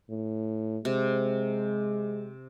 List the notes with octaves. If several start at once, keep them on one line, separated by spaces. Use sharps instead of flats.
A2
C3 G#3